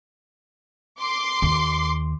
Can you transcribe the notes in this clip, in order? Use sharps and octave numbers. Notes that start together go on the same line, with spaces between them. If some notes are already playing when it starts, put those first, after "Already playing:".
C6 D6 C7
D#2